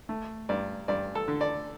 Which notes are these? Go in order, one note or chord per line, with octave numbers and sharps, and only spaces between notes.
A3
G2 D5
G2 D5
A4
D3
D5